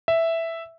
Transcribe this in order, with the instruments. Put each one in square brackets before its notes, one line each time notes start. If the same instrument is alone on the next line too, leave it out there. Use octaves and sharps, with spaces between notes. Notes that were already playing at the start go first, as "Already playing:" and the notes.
[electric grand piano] E5